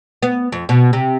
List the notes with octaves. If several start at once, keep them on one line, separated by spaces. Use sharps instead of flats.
B3
F2
B2
C3